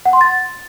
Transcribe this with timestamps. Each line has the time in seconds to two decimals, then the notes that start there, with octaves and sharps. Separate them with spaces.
0.05 F#5
0.13 C6
0.21 A6